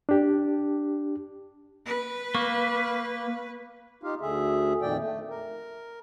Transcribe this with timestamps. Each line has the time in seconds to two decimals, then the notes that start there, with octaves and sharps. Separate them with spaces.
0.09 D4 G4
1.86 B4
2.35 A#3 C#6
4.03 D#4 F4 G4 F5
4.21 D2 D3 G#4 E5
4.81 F2 A#2 D#3 D5 G5
5.00 A3
5.30 A#4